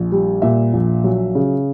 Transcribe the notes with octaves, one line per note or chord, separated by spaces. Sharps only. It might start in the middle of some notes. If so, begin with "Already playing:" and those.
Already playing: A#1
G3
A#2 E5
A#1
F#3
C#3